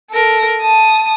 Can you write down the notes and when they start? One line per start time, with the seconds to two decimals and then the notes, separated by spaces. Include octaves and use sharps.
0.11 A4 A#4
0.62 A5 D#6